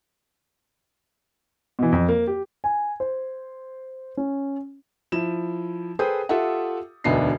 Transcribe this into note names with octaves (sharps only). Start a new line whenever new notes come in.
B2 E3
F2
A#3
G4
G#5
C5
C#4
F3 E4 E7
G#4 A4 B4 C5 G5 D#6
F4 G4 A4 E5 F#5
E1 D2 B3 D4 D#4 C7